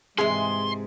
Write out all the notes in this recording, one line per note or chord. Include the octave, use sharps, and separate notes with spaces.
G#2 C3 E3 G#3 G#4 C6